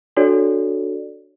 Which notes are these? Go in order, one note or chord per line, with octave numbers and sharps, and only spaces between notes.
D4 F#4 A4 C#5 D5